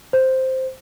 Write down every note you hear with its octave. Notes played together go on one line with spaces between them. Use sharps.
C5